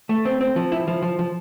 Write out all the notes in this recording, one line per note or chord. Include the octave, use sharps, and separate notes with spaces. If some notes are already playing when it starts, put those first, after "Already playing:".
A3
C4
C4
F3
E4
F3
F3
F3